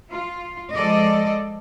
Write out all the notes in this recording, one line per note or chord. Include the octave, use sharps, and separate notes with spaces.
F4
F3 G#3 A4 D5 D#5